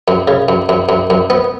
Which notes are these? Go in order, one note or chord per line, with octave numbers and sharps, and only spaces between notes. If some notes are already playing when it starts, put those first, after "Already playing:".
F#2
C#3
F#2
F#2
F#2
F#2
B3